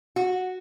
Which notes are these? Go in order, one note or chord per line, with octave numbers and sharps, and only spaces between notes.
F#4